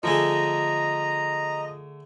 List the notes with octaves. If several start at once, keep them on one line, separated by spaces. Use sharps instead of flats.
D3 F3 A3 G#4 D#5 A#5